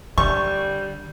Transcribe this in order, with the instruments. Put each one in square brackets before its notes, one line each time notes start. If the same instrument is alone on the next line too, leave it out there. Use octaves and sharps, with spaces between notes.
[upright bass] D3 [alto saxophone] G3 [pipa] C#6